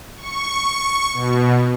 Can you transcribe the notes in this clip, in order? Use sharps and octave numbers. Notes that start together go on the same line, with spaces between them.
C#6
B2